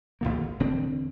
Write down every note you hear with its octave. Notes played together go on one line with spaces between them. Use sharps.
G#1 D#2 D3 A#3
E1 D3 C4 D4